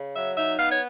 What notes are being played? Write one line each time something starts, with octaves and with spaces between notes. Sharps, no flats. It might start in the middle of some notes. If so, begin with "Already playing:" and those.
Already playing: C#3
F#3 E5
D#4 E5
B3 F5
C#5